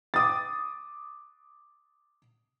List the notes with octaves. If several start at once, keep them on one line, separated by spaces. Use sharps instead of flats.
D6 D#6 A6